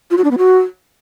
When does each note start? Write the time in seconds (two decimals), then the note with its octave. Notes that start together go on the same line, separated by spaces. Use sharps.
0.10 F4
0.17 F#4
0.24 D4
0.31 B3
0.38 F#4